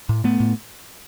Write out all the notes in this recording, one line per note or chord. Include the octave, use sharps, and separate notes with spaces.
A2
A2 A3 B3
A2